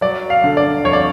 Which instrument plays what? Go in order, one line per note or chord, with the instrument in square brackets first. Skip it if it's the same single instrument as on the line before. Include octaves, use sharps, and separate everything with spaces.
[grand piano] F#3 D5
F5
D3
D5
F2 C#5
D5